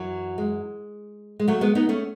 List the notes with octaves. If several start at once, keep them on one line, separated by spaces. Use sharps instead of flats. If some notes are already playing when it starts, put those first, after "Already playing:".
Already playing: F#2 E3 F#3
G#3
G#3
F#3 A3
G#3 B3
B3 D#4
A3 C#4